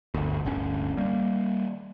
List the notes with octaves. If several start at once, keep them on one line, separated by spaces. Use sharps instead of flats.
G1 D2
D1 G1 D3 C#4
G3 A#3